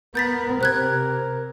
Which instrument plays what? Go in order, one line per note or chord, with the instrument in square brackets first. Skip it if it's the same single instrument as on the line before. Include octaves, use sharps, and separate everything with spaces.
[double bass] B3 [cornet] A#4 [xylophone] G6 A6 B6
[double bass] C3 [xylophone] C5 F#6 G#6